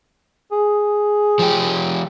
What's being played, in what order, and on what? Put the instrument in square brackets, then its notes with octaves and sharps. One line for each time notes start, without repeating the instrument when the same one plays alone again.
[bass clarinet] G#4
[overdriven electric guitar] F3 G4